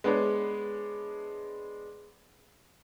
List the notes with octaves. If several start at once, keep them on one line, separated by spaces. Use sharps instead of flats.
G#3 B3 D4 B4 C#5